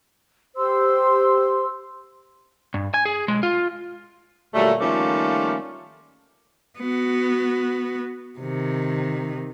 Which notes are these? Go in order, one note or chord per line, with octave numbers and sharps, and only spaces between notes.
G4 C5 C6 E6
G2
G#5
G#4
B1 G#3
F4
D2 A#2 F#3 G3 A3
D#3 F3 G3 A3 A#3 C#4
B3 F#4
C3 D#3